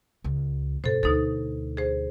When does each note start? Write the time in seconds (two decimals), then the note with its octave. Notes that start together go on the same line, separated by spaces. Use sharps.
0.24 C#2
0.84 G2 B2 A4 C5
1.03 D2 B2 D4 D#4 A4
1.77 G#4 C5